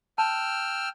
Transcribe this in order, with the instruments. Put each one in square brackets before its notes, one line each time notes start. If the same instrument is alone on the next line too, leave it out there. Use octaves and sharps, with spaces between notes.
[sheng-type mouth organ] G5 E6 F6 [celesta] A5